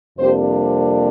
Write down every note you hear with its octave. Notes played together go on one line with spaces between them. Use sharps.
F2 C3 G3 A#3 D4 G4 C5